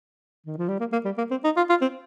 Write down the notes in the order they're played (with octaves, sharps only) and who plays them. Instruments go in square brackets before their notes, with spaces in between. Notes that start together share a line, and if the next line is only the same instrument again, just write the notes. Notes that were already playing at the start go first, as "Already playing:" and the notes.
[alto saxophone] D#3
F3
G3
A#3
A#3
G3
A#3
C4
D#4
F4
F4
C4